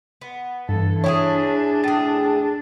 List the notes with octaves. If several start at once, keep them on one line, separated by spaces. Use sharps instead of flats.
B3
G2 E3 A4
D4 E4 G4 G#4 C#5
A2 G#4 A6